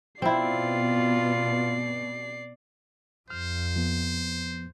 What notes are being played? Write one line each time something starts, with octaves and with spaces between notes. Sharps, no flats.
B2 C4 E4 F4 D5 C7
F2 C5 F6
F3 B3